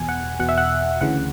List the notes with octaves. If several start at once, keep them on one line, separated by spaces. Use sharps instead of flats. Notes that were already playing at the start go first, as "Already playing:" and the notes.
Already playing: E2 B2 G#5
F#5
E2 B2 F#5
E5
F#5
D2 C#3 E3 F#5